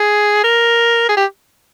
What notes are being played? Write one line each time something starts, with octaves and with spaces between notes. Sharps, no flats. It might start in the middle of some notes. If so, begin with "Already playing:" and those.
Already playing: G#4
A#4
G#4
G4